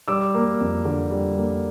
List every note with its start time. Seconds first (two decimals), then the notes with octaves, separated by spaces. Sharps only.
0.08 G3 D6 E6
0.34 A#3
0.60 F2
0.85 D3
1.11 G3
1.37 A#3